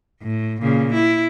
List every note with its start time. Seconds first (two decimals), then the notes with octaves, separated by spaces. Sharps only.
0.22 A2
0.61 A#2 C#3
0.94 E4